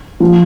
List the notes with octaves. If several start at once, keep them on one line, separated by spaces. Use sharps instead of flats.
F3